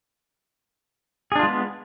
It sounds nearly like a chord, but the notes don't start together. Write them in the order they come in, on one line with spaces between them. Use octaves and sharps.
G#4 D4 F4 G#3 B3